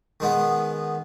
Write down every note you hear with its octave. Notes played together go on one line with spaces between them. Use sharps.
D#3 G#3 B3